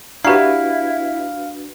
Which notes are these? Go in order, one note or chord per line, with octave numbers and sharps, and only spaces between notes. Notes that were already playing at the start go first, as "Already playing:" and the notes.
D4 E4 F#4 G4 B4 F5 A#5